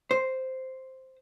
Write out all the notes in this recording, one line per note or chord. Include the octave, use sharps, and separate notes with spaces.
C5